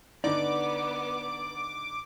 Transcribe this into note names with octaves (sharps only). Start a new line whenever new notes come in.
D3 B3 D#4 D5 D6